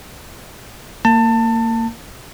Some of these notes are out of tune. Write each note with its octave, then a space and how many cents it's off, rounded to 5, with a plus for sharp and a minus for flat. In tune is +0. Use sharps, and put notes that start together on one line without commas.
A#3 -25 A5 +25